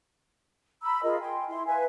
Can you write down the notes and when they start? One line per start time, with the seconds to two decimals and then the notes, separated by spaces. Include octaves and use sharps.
0.82 A#5 B5 E6
1.03 F4 G#4 A#4 D#5
1.20 G5 G#5 C6
1.48 E4 C6
1.66 B4 E5 F5 G#5